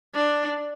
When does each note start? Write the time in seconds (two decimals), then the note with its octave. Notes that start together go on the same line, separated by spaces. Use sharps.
0.14 D4